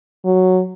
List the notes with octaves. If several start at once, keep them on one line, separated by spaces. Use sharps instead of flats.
F#3